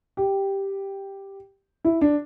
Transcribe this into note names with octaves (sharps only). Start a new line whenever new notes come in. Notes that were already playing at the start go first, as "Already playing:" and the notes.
G4
E4
D4